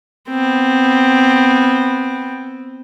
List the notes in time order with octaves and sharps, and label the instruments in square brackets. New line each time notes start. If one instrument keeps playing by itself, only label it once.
[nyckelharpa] B3 C4